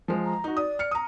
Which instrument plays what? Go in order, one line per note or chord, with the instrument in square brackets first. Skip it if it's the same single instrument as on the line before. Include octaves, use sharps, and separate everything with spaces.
[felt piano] F3 G#3
[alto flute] A#5
[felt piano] D#4 F#4
[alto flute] D5 [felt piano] D#6
[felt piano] F6 C#7
A#5 D#6